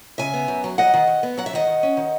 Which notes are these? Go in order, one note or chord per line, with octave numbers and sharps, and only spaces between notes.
C#3 E5 G#5
B3
F#2
F#3
F#3 D#5 F#5
D#3
D#3
B3
F#3 F#5
E5
D#3 D#5 F#5
D#3
C#4
D#3